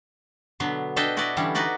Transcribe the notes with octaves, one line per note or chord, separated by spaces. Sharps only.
B2 D3 F#3 B3
D4 A4 B4 D#5 G5
E4 F#4 A4 B4 D5 D#5
D3 E3 G3 C#4
D#4 F#4 B4 D5 D#5